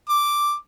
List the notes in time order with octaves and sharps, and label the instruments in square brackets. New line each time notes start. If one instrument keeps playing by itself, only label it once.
[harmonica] D6